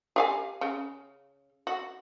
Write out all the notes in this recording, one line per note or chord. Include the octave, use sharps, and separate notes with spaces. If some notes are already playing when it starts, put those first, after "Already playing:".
G4 F5 G#5
C#3
F#4